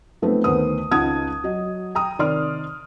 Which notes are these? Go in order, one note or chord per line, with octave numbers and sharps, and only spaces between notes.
F3 A3 B3 C4 D#4
D2 D#3 B3 C5 D#6
C#2 D#4 F#5 A5 D#6 G#6
F#3 D#5
G5 A#5 D#6
C3 D#3 D5 C6 F6